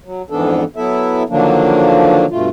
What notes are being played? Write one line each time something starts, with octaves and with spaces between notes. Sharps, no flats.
F#3
F2 G#2 E3 B3 D4 A4
F#3 B3 E4 A4 E5
D3 D#3 F3 F#3 A#3 D4
G2 B2 A3 F4